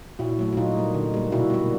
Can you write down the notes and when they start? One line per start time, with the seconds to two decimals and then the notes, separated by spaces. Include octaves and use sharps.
0.19 A#2 E4 F#4
0.39 F#3 A3
0.52 F#4
0.57 A#2 D#4 F4
0.76 G3 A#3
0.95 D3
1.14 G3 A#3
1.32 B2 E4 F#4
1.50 G3 A#3